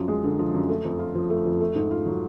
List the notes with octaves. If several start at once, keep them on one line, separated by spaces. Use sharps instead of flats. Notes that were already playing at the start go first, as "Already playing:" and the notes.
Already playing: F#2 F3
G#3
D3
F3
F#2
A3
F2
F4
F3
A3
F2
A3
G#2
F4
F#3